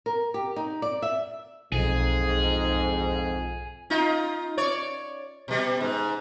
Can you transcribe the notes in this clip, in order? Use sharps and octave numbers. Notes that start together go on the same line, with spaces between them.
A#4
G4
D#4
D5
E5
B1 F2 G#2 G#4
D#4 F4
C#5 D5
B2 G3
G#2